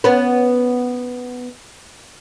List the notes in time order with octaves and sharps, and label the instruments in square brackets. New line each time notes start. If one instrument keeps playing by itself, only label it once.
[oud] B3 C#4 B4